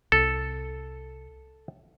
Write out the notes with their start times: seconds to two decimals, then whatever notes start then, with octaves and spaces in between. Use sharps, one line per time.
0.12 C2 A4